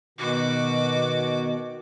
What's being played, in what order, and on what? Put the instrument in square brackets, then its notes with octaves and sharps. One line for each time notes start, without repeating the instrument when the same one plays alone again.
[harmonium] B2 D#3 [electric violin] F#4 D6